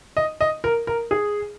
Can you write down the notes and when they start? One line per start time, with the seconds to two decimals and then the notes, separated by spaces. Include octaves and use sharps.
0.17 D#5
0.41 D#5
0.64 A#4
0.87 A#4
1.11 G#4